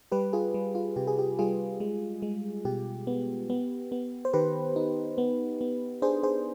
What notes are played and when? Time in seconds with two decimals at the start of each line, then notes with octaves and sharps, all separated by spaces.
0.12 G3 G4 B4
0.33 F4 G#4
0.54 G3
0.75 F4
0.96 C3 G4
1.07 G#4
1.19 G4
1.39 G3 F4 G#4
1.80 G#3
2.22 G#3
2.65 B2 G4
3.07 B3
3.50 B3
3.92 B3
4.25 C5
4.33 D#3 G4 B4
4.76 D#4
5.18 B3
5.61 B3
6.02 D4 G#4 C5
6.23 G#4 C5